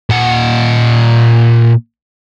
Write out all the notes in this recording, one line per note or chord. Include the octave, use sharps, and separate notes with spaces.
A#2 F#5